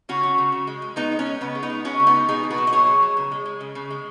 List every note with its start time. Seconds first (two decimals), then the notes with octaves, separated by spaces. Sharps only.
0.09 C#3 C#4 F#4
0.23 F#3
0.38 C#3
0.52 C#3
0.67 G#3
0.82 G#3
0.96 G#3 B3 D#4
1.12 G#3
1.19 C#4
1.26 G#3
1.41 C#3 B3
1.55 G#3
1.63 B3 D#4
1.70 G#3
1.85 G#3 C#4 F#4
1.99 C#3
2.07 B3 D#4
2.14 G#3
2.29 B2 D#4 G#4
2.43 B2
2.50 F#4 B4
2.58 F#3
2.67 D#5
2.73 B2 G#4 C#5
2.87 F#3
3.02 F#3
3.17 C#3
3.31 G#3
3.46 G#3
3.61 C#3
3.75 C#3
3.90 G#3